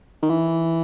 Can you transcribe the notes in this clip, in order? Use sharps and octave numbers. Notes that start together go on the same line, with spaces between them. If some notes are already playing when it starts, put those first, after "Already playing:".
D#3
E3